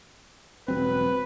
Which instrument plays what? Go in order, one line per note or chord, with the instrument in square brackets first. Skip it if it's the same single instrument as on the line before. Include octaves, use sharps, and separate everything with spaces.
[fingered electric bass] E1 F#3 C4 [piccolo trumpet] B4